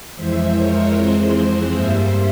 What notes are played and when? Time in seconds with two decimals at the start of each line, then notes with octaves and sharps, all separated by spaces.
0.15 F2 E3 G#3 C5 E5
0.54 A#4 C#5
0.93 F2 E3 G#3 C4 G#4 C5
1.72 G2 G3 A#3 C5 E5